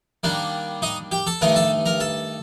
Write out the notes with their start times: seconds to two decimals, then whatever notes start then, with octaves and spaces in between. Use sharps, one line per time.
0.23 D#3 G3 A#3 D4
0.82 D#4 D#5
1.12 G4 G5
1.27 A4 A5
1.41 G2 D#3 A3 D#4 A#4 A#5
1.56 A4 A5
1.86 A#4 A#5
2.00 A4 A5